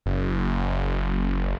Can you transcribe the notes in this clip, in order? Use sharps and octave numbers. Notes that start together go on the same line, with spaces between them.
F#1